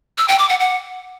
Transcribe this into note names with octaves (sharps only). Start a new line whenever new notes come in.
E6
G5
D6
F#5
F#5